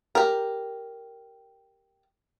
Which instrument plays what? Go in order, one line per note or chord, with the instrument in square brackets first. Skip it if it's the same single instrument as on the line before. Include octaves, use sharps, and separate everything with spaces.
[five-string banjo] G4 A#4